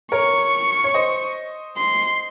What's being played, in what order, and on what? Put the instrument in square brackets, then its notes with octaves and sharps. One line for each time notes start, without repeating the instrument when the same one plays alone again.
[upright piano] A#4 C#5 [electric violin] C#6
[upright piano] C#5
C5 D#5
[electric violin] C6